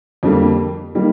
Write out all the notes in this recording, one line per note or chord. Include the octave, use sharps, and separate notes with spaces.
F2 D3 G3 A#3
D#3 G3 A#3